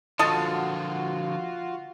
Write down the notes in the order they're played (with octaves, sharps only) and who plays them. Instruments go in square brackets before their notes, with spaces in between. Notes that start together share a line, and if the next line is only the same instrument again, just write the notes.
[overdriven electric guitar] D3 F3 [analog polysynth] F4 F#4 [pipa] A4 D#5 A5